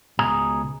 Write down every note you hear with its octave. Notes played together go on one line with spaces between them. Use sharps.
C#2 B2 G#4 A#5